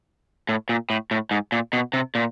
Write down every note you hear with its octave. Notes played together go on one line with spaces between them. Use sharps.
A2
A#2
A2
A2
G#2
A#2
B2
C3
A#2